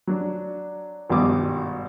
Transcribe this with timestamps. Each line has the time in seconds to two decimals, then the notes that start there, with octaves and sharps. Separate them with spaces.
0.07 F#3 D4
1.10 G#1 G2 B2 G3 D6 D#6